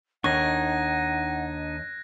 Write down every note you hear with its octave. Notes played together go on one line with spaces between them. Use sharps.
D#2 D4 D#4 F#5 C#6 F#6 G#6 A#6